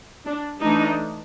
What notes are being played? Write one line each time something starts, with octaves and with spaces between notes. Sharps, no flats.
D4
E3 A3 D4 D#4